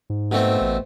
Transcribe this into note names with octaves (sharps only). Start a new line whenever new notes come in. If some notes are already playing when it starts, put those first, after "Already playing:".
G#2
B2 A3 C4
A1